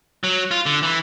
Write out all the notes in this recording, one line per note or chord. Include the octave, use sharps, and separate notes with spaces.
F#3
F4
D3
E3